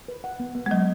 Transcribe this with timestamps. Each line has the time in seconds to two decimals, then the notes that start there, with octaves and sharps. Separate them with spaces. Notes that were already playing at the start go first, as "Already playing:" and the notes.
0.08 B4
0.24 F#5
0.40 B3
0.55 B3
0.66 G#3
0.71 F#3 D#5